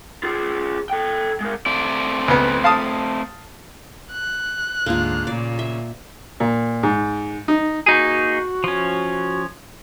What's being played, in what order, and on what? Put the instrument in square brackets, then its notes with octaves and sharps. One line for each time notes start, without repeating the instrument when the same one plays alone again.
[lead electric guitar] F4 G#4
A4 G5
G#3 A#4
[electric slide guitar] A3 C4 D5
[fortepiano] C#2 B3
F5 A5 D#6
[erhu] F#6
[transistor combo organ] D2 G#2 F5 [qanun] A#3 F4
[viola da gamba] A#2 [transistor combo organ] C#3 [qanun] D5
[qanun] E5
[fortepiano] A#2
G#2
D#4
[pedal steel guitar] A#3 D#4 G#4 [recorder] F#4
[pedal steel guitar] F3 C#4